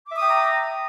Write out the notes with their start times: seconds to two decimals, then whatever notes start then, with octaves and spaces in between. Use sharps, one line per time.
0.07 D6
0.12 E5
0.17 D#6
0.21 G5
0.26 A#5